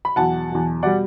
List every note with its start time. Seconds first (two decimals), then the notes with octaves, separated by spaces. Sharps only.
0.05 B5
0.16 E2 B2 F#3 F#5 A5
0.50 E2 B2 F#3
0.83 B2 G3 D5 F#5